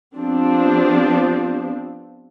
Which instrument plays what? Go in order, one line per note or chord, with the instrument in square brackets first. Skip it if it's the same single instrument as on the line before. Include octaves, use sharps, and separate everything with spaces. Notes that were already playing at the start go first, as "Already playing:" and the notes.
[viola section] F3 B3 C4 D4 G4